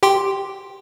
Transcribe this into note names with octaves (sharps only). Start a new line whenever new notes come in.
G4 G5 C6